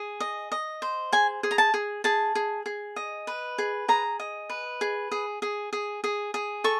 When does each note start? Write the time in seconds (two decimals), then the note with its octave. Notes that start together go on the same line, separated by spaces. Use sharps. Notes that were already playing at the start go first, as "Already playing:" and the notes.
Already playing: G#4
0.20 D#5
0.52 D#5
0.82 C5
1.13 G#4 G#5
1.43 G#4
1.51 A#5
1.58 A5
1.74 G#4
2.04 G#4 A5
2.35 G#4
2.66 G#4
2.96 D#5
3.27 B4
3.58 G#4
3.88 G#4 A#5
4.20 D#5
4.50 B4
4.81 G#4
5.11 G#4
5.42 G#4
5.73 G#4
6.04 G#4
6.34 G#4
6.64 A4 C#6